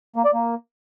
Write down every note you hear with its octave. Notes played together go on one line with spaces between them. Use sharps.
A#3
D5
A#3